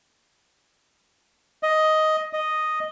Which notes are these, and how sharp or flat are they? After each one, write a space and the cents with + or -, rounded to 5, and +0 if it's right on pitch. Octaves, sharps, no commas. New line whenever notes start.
D#5 +5
D#5 -5